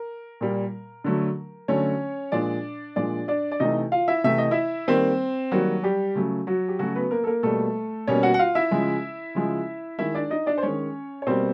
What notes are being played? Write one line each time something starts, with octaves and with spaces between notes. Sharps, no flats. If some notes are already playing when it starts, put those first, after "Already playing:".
Already playing: A#4
A#2 G3 A#3
D3 F#3 A3
D3 F#3 A3 C#4 C#5
A#2 F3 G#3 D4 D5
A#2 F3 G#3 D4 D5
D4 D5
D5
C3 E3 A3 D#4 D#5
F4 F5
E4 E5
C3 E3 A3 E5
D#5
E4 E5
D#3 G3 A#3 C4 C5
D#3 F#3 G3 A#3 F#4
G3 G4
C#3 F#3 A3
F#3 F#4
G4
C#3 F#3 A3 F#4
B3 B4
A#3 A#4
A4
A#3 A#4
B2 G3 A3 A#3 A4
B2 G3 A#3 C#4 C#5
F#4 F#5
F#5
F4 F5
E4 E5
C#3 F3 G#3
C#3 F3 G#3
D#3 G#3 E4 E5
D4 D5
D#4 D#5
D4 D5
C5
D#3 G#3 C#4 C#5
C#5
B2 G3 A#3 C4 C5